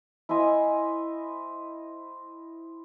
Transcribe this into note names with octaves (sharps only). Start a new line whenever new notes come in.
E4 C5 D#5 G#5